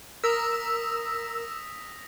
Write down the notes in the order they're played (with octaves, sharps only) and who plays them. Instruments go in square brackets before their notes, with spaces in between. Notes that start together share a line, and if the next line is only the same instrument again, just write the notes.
[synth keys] A#4 [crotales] D#6 A#6 B6 [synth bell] E6